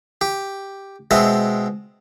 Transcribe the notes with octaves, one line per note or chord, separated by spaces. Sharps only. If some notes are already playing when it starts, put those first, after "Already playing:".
G4
B2 G#3 C4 E5